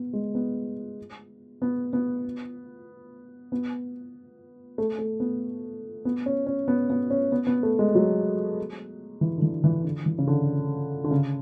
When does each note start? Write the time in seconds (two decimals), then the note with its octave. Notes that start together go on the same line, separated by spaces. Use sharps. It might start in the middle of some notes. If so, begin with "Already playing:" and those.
Already playing: B3
0.13 G#3
0.35 B3
1.62 B3
1.93 B3
3.52 B3
4.78 A3
4.99 A3
5.20 B3
6.05 B3
6.26 C#4
6.47 C#4
6.68 B3
6.90 B3
7.10 C#4
7.32 B3
7.47 B3
7.63 A3
7.79 G#3
7.95 F#3
9.21 E3
9.38 D3
9.42 E3
9.64 E3
9.84 D3
10.06 E3
10.19 C#3
10.28 D3
11.04 D3
11.11 C#3